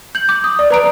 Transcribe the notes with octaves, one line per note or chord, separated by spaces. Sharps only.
G6 F#7
D6
D#6
D5
B4 A#5 D7